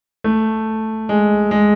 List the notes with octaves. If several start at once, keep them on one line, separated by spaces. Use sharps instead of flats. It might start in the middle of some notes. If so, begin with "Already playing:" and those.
A3
G#3
G#3